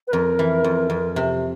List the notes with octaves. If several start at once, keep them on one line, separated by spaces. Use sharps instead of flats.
B4
F2 A#4
E3
F2
F2
C3